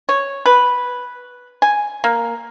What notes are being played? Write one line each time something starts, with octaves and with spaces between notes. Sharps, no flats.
C#5
B4
G#5
A#3